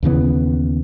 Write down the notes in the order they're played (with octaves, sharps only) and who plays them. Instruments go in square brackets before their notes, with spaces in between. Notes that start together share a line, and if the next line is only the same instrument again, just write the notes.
[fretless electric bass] D#2 C#3 E3 B3